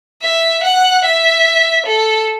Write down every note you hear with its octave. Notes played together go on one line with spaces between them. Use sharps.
E5
F#5
E5
A4